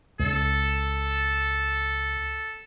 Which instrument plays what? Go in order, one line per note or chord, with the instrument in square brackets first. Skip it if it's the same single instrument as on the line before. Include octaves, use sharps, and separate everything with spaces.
[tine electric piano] C#2 [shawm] A4